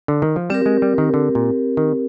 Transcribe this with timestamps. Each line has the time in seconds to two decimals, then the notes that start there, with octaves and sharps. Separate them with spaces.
0.08 D3
0.22 D#3
0.36 F3
0.50 G3 C4 G4 A#4
0.66 G#3
0.82 G3
0.98 D#3
1.14 D3
1.35 A#2
1.77 D#3